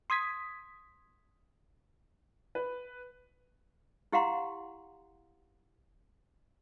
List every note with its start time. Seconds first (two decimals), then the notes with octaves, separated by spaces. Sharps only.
0.10 C6 D#6 G#6 B6
2.55 B4
4.12 E4 G4 F5 F#5 A#5 C6